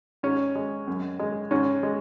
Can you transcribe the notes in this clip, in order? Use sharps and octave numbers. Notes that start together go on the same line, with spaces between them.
G#2 C#4
G#3
F#2
G#3
G#2 C#4
G#3